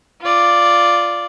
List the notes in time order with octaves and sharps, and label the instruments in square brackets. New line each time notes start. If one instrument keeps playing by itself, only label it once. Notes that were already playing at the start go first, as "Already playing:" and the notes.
[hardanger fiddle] F4 D5